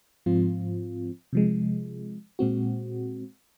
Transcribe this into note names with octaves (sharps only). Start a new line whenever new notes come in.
G#2 F3 C4 F4
C3 F3 G#3
A#2 G#3 C4 F#4